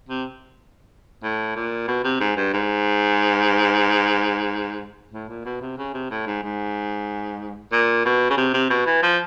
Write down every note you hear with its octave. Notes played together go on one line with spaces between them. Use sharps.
C3
A2
A#2
B2
C3
G#2
G2
G#2
A2
A#2
B2
C3
C#3
C3
A2
G#2
G#2
A#2
B2
C#3
C3
C3
B2
E3
F3